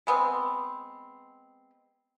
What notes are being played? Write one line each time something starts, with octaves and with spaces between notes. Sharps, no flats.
G#3 B3 C4